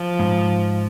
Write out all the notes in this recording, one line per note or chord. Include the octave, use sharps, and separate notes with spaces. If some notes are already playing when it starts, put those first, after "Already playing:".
Already playing: F3
G#2